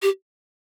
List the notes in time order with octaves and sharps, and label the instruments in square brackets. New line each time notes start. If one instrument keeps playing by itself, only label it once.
[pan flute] G4